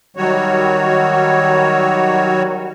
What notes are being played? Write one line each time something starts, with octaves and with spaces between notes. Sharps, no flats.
D#3 F#3 G3 F#4 C#5